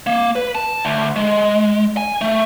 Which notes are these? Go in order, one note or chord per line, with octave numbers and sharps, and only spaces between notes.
A#3
B4
A5
D2
G#3
G#5
A3